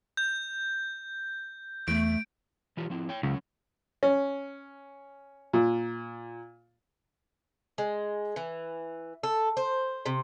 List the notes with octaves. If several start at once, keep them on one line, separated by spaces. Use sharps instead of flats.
G6
E2 A3 D7
E3 F4 G4
F3 C4 E4
C#5 G5
C#2 F#3 C#4
C#4
A#2
G#3
E3
A4
C5
C3